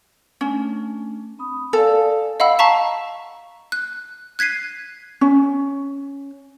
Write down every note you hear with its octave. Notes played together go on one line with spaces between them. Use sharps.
A3 C#4 D4
C4 B5 D#6
A4 D5 F5 G#5
D#5 F5 F#5 B5 E6
F5 A5 A#5 C#6 B6 E7
F#6
F#6 G#6 B6 C7 D#7
C#4